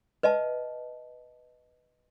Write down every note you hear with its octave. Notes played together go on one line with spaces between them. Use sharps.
B4 D#5 E5 A5